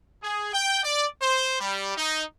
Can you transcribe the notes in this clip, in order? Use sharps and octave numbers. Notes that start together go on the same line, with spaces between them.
G#4
G5
D5
C5
G3
D#4